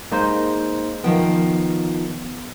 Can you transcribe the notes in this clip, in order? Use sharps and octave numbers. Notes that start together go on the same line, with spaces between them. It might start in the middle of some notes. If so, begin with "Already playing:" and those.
G#3 A#3 D#4 C5
D#3 F3 B3 G5